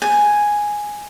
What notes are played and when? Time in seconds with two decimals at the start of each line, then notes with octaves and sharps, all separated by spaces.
0.02 G#5